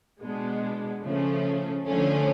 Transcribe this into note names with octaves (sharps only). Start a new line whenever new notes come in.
B2 G#3 B3 D4
C#3 F3 A3 C#4
D3 F3 A3 C#4